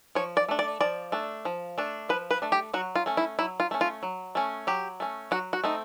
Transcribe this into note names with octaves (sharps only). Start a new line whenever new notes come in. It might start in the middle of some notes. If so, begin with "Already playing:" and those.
F3 C#5
D5
A3 D4
D5
F3 D5
A3 D4
F3
A3 D4
F3 B4
B4
A3 D4
G4
F#3 F#4
F4
A3 C#4
E4
F#3 E4
F4
A3 C#4
F4
F#3
A3 C#4
F#3 G4
A3 C#4
F#3 F#4
F#4
A3 C4 D#4